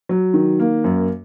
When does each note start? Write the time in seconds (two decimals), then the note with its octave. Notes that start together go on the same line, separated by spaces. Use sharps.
0.09 F#3
0.34 D#3
0.60 A#3
0.84 F#2